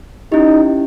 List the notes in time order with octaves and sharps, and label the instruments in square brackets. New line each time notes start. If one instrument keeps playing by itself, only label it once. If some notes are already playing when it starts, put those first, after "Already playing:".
[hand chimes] C#4 E4 G4 [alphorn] D#4